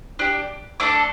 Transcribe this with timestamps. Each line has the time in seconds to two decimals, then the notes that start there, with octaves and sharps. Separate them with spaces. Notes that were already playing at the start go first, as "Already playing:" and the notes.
0.19 D4 G4
0.80 A3 D4 A4 D6